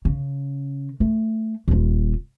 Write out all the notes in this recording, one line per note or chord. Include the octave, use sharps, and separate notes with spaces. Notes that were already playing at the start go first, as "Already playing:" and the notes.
C#3
A3
D#1 F4